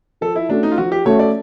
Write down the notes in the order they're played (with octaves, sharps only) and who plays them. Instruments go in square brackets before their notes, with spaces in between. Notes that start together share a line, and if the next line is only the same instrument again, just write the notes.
[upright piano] F3 [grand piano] A4
[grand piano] E4
[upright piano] A3 C#4 F#4 A4 [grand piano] D4
[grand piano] D#4
F4
[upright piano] F3 [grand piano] F#4
[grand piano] G4
[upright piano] A3 C#4 F#4 A4 [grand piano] C#5
[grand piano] D5